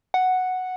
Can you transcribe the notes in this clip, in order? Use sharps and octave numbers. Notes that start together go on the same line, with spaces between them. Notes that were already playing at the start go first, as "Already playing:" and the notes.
F#5